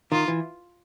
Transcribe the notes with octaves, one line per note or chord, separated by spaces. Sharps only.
D#3 F4
E3